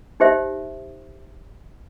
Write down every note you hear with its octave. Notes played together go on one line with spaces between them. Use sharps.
D#4 G4 C5 E5